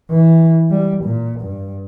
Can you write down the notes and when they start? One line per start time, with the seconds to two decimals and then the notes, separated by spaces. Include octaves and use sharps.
0.10 E3
0.71 G3
1.05 A#2
1.40 G2